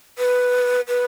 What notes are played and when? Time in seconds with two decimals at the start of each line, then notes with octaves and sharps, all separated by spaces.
0.18 B4
0.88 B4